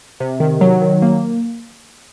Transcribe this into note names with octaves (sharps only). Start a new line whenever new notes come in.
C3
D#3
F#3
D#3
A#3